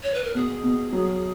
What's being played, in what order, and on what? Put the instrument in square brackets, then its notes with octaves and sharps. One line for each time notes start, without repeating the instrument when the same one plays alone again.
[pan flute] C#5
B4
A#4
[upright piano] B2 [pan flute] G#4
[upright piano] B2
F#3